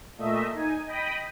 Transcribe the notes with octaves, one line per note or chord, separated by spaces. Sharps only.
A#2 A3 D#5 E5
D#4 G#5
D#5 G5 B5 D#6